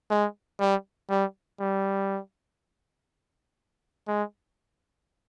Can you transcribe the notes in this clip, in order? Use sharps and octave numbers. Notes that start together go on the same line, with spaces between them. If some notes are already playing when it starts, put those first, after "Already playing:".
G#3
G3
G3
G3
G#3